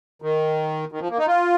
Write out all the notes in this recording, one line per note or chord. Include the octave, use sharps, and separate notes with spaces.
D#3
D#3
F3
A#3
D#4
F4